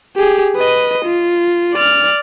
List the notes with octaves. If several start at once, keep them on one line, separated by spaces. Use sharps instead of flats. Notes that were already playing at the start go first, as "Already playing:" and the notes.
G4 G#4
B4 D#5
F4
D5 F6